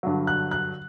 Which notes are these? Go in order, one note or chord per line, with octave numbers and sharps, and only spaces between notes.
G2 D3 F#3
F#6
F#6